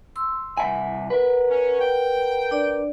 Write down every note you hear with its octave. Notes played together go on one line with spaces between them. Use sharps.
C6 E6
C2 E5 F#5 G#5
A#4 B4
C#4
G5
D4 D5